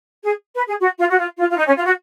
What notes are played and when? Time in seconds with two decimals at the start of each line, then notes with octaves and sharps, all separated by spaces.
0.24 G#4
0.55 B4
0.67 G#4
0.80 F#4
0.99 F4
1.10 F#4
1.18 F4
1.38 F4
1.50 F4
1.56 D#4
1.66 C#4
1.75 F4
1.84 F#4